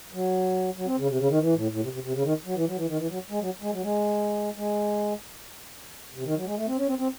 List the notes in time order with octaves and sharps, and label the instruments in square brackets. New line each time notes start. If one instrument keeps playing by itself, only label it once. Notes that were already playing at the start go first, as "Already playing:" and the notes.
[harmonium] F#3
F#3
C4
C#3
C3
C#3
D#3
E3
A2
A2
C3
C3
C3
C#3
D#3
F#3
E3
F#3
E3
D#3
E3
F#3
G#3
F#3
G#3
F#3
G#3
G#3
C3
D#3
F#3
G#3
A3
C4
C#4
C4
C4